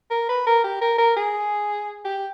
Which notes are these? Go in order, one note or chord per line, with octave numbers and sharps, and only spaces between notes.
A#4
B4
A#4
G4
A#4
A#4
G#4
G4